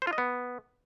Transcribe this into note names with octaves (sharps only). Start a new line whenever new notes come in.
C5
F4
D#5
B3